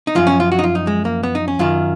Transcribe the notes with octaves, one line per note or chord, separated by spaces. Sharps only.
D#4
F#2 F3 F4
C#4
F4
F#4
D#4
F4
D#4
G#3
A#3
B3
D#4
C#4
F#2 D#3 F4